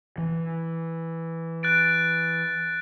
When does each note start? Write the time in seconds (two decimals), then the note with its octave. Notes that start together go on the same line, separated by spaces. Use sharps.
0.18 E3
1.63 F#6 A6 D7